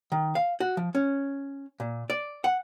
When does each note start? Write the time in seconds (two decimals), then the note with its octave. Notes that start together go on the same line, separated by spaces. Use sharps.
0.12 D#3
0.35 F5
0.60 F#4
0.77 F3
0.95 C#4
1.80 A#2
2.10 D5
2.44 F#5